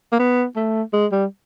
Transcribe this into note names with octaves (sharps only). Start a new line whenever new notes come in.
A#3
B3
A3
G#3
G3